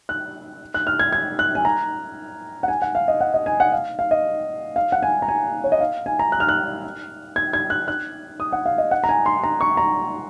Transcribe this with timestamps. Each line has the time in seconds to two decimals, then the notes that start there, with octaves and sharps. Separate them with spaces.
0.09 F#6
0.74 F#6
0.87 F6
0.99 G#6
1.12 G#6
1.39 F#6
1.55 G#5
1.65 A#5
2.63 F#5
2.68 G#5
2.82 F#5
2.95 F5
3.08 D#5
3.21 F#5
3.34 D#5
3.46 G#5
3.60 F#5
3.72 F5
3.99 F5
4.11 D#5
4.76 F5
4.92 F#5
5.03 G#5
5.22 A#5
5.28 G#5
5.64 C#5
5.72 D#5
5.80 F5
6.06 G#5
6.19 A#5
6.32 F#6
6.40 F6
6.49 F#6
7.36 G#6
7.53 G#6
7.70 F#6
7.88 F#6
8.40 D#6
8.52 F#5
8.66 F5
8.78 D#5
8.91 F#5
9.04 A#5
9.09 G#5
9.26 C6
9.44 A#5
9.61 C#6
9.77 A#5